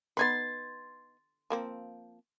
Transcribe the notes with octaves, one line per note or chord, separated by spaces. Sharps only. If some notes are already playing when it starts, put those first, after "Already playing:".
B3 D#4 B4 C6 G#6 A6
F3 A#3 C4